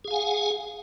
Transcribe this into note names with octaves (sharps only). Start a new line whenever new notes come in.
G#4 F5 F#5 G#5